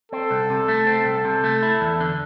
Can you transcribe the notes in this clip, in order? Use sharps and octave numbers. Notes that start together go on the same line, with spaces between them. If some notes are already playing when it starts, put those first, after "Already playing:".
C4 A4
C2
C3
A3
C4
C2
C3
A3
E4
E2
D3